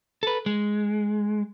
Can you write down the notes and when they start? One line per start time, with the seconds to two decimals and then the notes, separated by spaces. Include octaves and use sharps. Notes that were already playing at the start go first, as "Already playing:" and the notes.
0.23 A4 B4
0.46 G#3